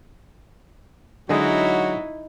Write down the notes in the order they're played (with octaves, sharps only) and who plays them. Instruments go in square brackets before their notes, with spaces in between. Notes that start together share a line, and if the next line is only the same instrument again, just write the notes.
[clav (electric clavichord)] D3 G#3 D#5 [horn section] F#3 F#4 [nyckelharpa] D#4 E4